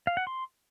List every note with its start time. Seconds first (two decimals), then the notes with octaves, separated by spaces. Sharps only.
0.07 F5
0.17 F#5
0.27 C6